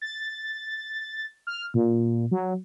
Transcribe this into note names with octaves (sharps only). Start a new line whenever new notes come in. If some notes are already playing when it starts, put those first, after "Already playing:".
A6
F6
A#2
F#3